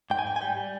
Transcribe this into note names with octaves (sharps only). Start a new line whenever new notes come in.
G#2 G5
G#5
G#2 G5
G#5
G3 G5
G3